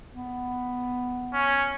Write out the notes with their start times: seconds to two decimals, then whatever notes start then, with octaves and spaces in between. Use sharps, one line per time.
0.14 B3
1.33 C#4